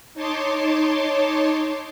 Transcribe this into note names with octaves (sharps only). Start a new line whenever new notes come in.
D#4 C#5 A5 C6 D6